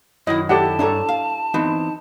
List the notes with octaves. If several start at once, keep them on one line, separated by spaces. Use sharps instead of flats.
F#2 D#3 E4 D#5
E4 G4 A4 D5 F#5 A5
G2 D4 A4 C#5 A#5
F5
E3 B3 C4 D#4